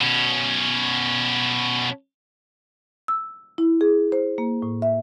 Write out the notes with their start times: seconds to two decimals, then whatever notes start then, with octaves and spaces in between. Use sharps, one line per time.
0.01 B2 C#4
3.08 E6
3.58 E4
3.81 G#4
4.12 C5
4.38 A#3
4.62 A2
4.82 E5